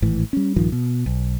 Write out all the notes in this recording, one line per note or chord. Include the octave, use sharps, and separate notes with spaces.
G#1 A2 E3
G3 C#4
A#1 G2 D#3 F3
B2
B1